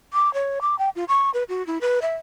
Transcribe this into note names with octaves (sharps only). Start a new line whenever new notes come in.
D6
C#5
D6
G5
F4
C#6
B4
F#4
E4
B4
E5